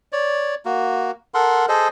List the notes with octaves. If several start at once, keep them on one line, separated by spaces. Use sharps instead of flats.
C#5 D5
A#3 F#4
A4 A#4 F#5 C6
G#4 A4 C5 D#5